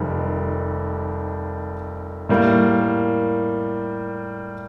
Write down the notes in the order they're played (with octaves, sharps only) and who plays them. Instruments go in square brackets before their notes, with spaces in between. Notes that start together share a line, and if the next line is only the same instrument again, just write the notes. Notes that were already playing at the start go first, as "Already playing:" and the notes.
Already playing: [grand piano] F1 F2 D#3 G3
A2 G3 A#3